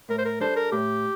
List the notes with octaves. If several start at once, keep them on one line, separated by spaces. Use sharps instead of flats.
A2 A#4
C5
A#4
G3 D4 A4 C5
A#4
A2 G4